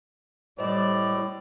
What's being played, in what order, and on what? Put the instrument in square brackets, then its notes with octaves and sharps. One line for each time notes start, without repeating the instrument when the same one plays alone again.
[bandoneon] A2 [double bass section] G3 [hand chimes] C5 D#5 [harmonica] D5